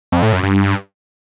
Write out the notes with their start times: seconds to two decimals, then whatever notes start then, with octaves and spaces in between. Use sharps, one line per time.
0.12 F2
0.23 A2
0.33 F#2
0.43 G2